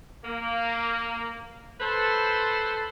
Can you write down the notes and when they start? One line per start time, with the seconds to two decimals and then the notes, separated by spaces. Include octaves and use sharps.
0.25 A#3
1.81 A4 B4 C5